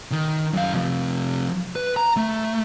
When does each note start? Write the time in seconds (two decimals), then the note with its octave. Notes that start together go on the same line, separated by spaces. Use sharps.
0.12 D#3
0.53 F#2 F5
0.75 C3 F3
1.76 B4
1.97 A#5
2.17 A3